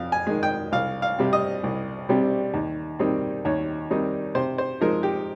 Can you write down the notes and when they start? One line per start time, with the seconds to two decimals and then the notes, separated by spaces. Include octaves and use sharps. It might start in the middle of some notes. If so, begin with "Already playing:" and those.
Already playing: F2 F5
0.12 G#5
0.27 D#3 G#3
0.43 G5
0.72 C2 F5
1.02 F5
1.19 C3 G3 C4
1.33 D#5
1.63 C2
2.09 C3 G3 C4
2.54 D#2
2.99 D#3 G3 C4 D#4
3.45 D#2 C#5
3.90 D#3 G3 C4 D#4
4.35 C3 C5
4.58 C5
4.81 F3 G#3 D#4 A#4
5.03 G4